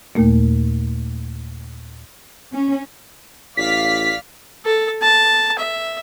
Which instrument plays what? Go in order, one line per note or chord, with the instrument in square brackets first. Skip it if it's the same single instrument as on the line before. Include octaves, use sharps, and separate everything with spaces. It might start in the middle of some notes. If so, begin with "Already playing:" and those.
[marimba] D#2 A#2 A3 A#3
[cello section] C#4
[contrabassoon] A1 [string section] D5 F5 F6 [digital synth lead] B6
[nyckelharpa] A4
A5
E5